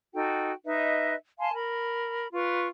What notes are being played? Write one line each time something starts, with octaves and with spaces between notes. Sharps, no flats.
D#4 F#4 A4 G5
D#4 B4 D#5 E5
F5 G#5 A5 C6
A#4 B5
F4 B4 C#6